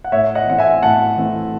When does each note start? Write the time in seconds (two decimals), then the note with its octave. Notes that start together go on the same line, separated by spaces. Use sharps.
0.04 F#5
0.12 A2 C#5 E5
0.35 D#5 F#5
0.47 E3 A3 C4 F#5
0.58 E5 G#5
0.83 A2 F#5 A5
1.17 E3 A3 C4